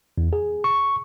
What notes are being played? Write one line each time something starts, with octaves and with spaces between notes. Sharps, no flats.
E2
G#4
C#6